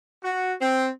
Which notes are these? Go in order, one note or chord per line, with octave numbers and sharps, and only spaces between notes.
F#4
C4